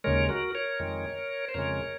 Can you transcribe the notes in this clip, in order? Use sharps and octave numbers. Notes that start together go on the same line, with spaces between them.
D#2 C#3 G#3 A#4 C#5
F#4 A#4
A#4 C#5
F2 D#3 G#3
C5
F2 C#3 G#3 A#4 C#5